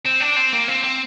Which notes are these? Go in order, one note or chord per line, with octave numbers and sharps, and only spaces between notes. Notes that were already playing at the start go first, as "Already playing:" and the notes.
C4
D4
C4
A#3
C4
C4